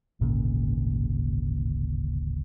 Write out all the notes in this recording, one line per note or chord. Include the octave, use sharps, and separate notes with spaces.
D1 G#1 A#2 C#3